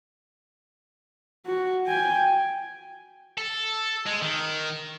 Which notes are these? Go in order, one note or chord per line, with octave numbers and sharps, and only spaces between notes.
F#4
G5 G#5
A4
G#3
D#3